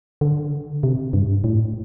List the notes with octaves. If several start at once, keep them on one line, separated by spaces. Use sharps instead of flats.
D3
C3
G2
A2